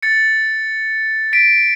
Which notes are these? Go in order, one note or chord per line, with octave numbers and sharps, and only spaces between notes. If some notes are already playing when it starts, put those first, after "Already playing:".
A6 C#7
B6 D7